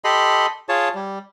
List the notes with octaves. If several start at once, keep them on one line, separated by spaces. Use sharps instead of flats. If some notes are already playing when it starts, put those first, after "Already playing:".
G4 A4 D#5 B5 C6
F4 G#4 C#5 A5
G3